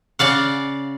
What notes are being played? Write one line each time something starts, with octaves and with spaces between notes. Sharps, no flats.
C#3 D5 F5 F#5